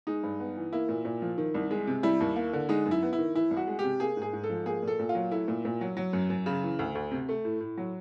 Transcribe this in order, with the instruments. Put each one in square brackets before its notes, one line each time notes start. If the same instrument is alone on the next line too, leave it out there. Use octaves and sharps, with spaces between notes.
[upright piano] G#3 D#4
G2
B3
E3
A#3 E4
A#2
A#2
F3
D#3
C2
G#3
C3
G3 E4
D#2
A#3
D3
G#3 D#4
F#2
E4
B3
E4
D#3
E3 E4
C2
F#4
G#3
G4
C3
A#3 G#4
G#2
G#4
G#2
A4
F3
A#3 G#4
A#2 A4
A#2
F4
F#3
A3 E4
A#2
A#2
F#3
F#3
F#2
F#2
C#3
E3
D2
D2
C3
A3
A2
A2
F#3